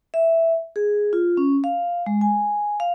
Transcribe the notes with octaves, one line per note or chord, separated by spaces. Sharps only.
E5
G#4
F4
C#4
F5
G#3
G#5
F5